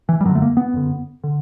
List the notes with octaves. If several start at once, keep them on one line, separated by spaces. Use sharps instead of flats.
E3
G3
F#2 D3 F#3
A3
A#3
B3
F#2 D3
D3